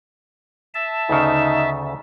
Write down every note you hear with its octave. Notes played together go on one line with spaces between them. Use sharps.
E5 A5
D2 C#3 D#4